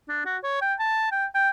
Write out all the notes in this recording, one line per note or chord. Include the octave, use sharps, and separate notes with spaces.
D4
F#4
C#5
G5
A5
G5
G5